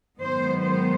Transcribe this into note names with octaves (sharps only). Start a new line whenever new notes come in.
G#2 D#3 F#3 B3 C5
C5